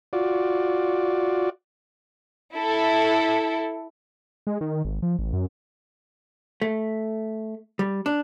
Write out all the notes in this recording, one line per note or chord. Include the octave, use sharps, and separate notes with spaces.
F4 F#4 D5
E4 A4
G#3
D#3
G#1
F3
A1
F#2
A3
G3
D4